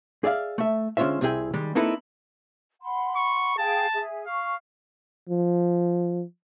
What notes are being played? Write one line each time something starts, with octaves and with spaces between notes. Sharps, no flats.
G#4 D5 E5 F5
A3 E5
D3 G#3 C#4 F4 C5 E5
C2 C4 E4 F4 G#4 G5
D#3 G3 G#3
A#3 C4 D#4 E4 A4 B4
F#5 B5 C6
C#6
G#4 F5 G5 A5
G#4 E5
F5 C#6
F3